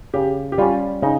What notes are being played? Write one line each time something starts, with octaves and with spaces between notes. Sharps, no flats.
C#3 G4
G4
G3 C#4 F4
C#3 D#4